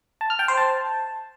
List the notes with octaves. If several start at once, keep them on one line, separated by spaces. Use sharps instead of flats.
A5
F6
G5
C5
A5